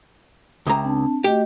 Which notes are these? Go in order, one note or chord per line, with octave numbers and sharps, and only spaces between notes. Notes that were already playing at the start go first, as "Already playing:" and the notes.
C#2 E5 G5 A#5
C4 D4 A5
A3 F#4 G4 D#5